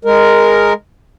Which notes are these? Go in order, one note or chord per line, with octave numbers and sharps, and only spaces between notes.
G#3 A#4